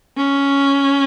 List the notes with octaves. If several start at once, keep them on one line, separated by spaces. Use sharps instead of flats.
C#4